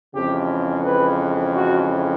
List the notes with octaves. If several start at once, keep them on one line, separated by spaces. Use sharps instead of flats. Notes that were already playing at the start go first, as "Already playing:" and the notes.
F2 C#3 E3 G#3 G4
B4
F#4